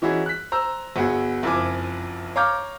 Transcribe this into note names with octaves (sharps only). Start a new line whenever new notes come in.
E3 C#4 D#4 E4 F#4 G#4
F#6 B6
C5 A#5 E6
G1 B3 F#4 G#4
F#1 F2 E4 F4 G#5 D6
C#5 F5 A#5 D6 F6 G6